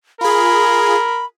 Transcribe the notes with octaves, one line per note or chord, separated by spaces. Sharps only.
F4 G#4 A#4 B5